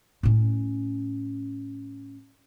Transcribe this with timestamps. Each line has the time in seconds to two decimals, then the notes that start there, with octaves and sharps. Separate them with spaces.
0.23 A2 C#4